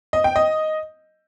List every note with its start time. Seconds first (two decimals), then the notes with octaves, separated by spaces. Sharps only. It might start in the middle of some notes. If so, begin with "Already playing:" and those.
0.13 D#5
0.24 G5
0.36 D#5